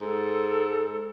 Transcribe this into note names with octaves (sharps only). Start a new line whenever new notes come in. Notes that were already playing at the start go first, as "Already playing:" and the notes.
G#2 A4